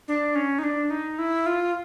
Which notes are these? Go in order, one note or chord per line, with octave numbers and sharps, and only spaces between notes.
D4
C#4
D#4
D4
D#4
E4
F4